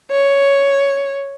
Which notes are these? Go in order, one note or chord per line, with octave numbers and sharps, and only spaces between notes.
C#5